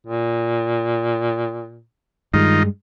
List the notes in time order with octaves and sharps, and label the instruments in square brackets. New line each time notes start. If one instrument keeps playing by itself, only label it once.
[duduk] A#2
[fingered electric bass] G2 G#3 [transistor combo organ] D#3 D#4 F4